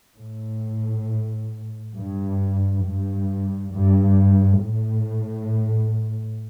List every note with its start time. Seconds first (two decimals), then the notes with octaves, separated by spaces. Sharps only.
0.17 A2
1.96 G2
2.84 G2
3.74 G2
4.63 A2